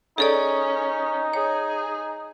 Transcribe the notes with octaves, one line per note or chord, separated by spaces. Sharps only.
C#4 D#4 G#4 A4 D5
G#4 C#5